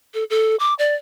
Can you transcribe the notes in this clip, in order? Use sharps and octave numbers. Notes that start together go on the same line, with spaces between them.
A4
A4
D6
D5